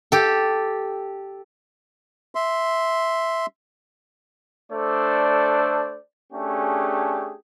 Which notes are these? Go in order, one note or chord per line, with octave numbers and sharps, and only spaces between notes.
G4 A4
E5 C6
A3 D4 A4 C5 D5
A3 C#4 D4 G4 G#4